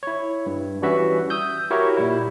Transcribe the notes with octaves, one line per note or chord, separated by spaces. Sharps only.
E4 C#5
G2
E3 G3 C#4 F#4 B4 E5
D#6 E6 G6
E4 F#4 G4 A#4 C#5 E5
A#2 G3 E4